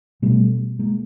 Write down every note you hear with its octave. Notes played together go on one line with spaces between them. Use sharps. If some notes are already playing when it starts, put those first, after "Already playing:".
B2 G3 A3
G#3 A#3